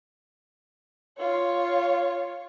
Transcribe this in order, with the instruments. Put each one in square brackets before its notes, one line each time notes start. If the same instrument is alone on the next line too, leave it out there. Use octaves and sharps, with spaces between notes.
[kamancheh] F4 C#5